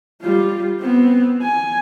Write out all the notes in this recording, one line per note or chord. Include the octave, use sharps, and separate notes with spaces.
G3 F4
B3 C4
G#5